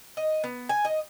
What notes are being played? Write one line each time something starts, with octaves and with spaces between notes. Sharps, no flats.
D#5
B3
G#5
D#5